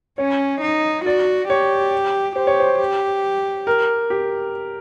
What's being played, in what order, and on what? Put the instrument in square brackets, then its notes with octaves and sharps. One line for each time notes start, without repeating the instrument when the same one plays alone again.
[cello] C#4 [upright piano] C#5
[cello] D#4
[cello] F#4 [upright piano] D5
[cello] G4 [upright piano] C#5
[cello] G4 [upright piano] C5
[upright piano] C#5
C5
[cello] G4
[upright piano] A#4
G4